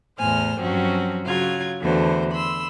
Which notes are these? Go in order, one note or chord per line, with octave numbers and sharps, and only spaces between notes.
E2 A2 C5 G#5 F6
G2 F3 F#3 C4 C#4 F#4
C#3 F#3 F4 G#6
E2 D3 E3 A3 F#4 C5
B5 C6 E6